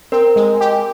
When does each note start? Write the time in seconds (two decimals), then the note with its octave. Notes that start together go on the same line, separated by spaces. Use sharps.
0.12 C4 A#4
0.36 G#3
0.61 G4